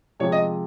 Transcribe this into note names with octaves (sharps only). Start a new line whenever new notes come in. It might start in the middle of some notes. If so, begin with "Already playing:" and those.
C3 F3 G#3 C#5
D#5